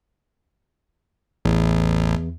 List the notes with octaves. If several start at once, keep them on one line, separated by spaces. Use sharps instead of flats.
A1 E2